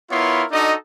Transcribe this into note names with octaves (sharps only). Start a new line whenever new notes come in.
B3 E4 F4 A#4 C#5 C6
D4 D#4 F#4 A4 D#5